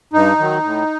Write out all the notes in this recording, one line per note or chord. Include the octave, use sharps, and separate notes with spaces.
G2 D#4
D#3 F#3
A2